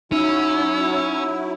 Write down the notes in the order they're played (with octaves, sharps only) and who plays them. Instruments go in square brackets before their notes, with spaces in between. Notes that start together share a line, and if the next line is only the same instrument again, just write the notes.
[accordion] F#3 E4 [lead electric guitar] C#4 [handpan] D#4 [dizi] E6